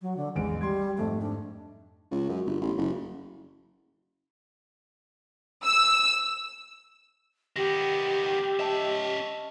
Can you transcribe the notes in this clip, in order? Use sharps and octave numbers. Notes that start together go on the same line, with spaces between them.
F#3
D3
A1 E2 G#3 D7
G3 C6 G#6
F2 G#2 A3
D4
C#2
F#2
G1
A1
F#1
E6
D#3 B3 G4 A#6
C#4 D#5 E5 A5